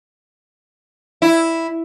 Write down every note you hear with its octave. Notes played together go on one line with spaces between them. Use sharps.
E4